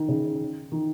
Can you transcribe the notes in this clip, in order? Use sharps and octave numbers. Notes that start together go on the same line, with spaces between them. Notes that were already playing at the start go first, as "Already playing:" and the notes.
Already playing: D#3
C#3
D#3